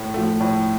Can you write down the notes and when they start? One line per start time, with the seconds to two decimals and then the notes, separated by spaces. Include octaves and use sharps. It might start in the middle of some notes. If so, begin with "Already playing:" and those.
Already playing: A2
0.14 F3 A3
0.41 A2